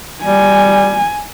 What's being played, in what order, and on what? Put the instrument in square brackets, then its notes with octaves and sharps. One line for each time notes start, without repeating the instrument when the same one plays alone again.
[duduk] G3 [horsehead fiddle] G#5